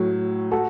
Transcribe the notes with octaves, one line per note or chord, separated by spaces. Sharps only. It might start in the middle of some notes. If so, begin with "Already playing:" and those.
Already playing: A2 F#3
F#4 A4